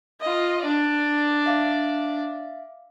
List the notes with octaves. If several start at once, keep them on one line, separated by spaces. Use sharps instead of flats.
F4 D#5
D4 D5
E5 F5 D6